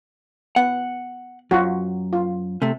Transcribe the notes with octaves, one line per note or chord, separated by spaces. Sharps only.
B3 F#5
F#2 F4 F#4
F4
C3 A3